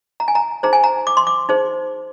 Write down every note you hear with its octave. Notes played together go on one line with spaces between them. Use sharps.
A#5
G#5
A#5
D#4 G#4 C5 A#5
G#5
A#5
D6
C6
D6
D#4 G#4 C5